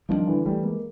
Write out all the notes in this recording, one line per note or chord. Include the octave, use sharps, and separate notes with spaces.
D#3 F3 G3 A#3 D4
D3 E3
E3 G3 A3
G#3 A#3